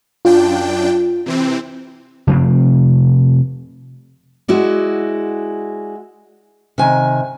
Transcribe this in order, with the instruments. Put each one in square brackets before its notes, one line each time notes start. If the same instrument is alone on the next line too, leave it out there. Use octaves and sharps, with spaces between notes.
[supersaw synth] F#2 D4 G5 [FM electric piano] F4
[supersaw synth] C3 E3 C4
[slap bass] C3 F3 A3 C4
[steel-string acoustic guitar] G#3 E4 F#4 D5
C3 D#3 G#5